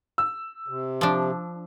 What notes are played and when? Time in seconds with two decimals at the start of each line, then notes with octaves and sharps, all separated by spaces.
0.18 E6
0.68 C3
1.01 F3 D4